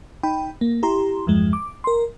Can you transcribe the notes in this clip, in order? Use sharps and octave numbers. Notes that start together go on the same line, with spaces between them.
D#4 G5 B5
A#3
E4 G4 A#5 C6
E2 G2 F3 G#3
D6
A#4 C6